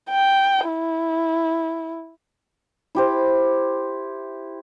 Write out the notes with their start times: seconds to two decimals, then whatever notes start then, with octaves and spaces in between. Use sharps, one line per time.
0.10 G5
0.68 E4
2.95 E4 G4 C5